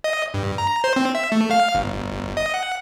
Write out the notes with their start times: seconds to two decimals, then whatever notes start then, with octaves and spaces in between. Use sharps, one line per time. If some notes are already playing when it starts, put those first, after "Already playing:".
0.04 D#5
0.34 G2
0.58 A#5
0.84 C5
0.96 C4
1.15 E5
1.32 A3
1.51 F5
1.75 G1
2.37 D#5
2.54 F#5